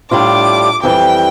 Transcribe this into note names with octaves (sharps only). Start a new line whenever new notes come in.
A2 G3 D4 F4 D6
F2 E3 G3 G5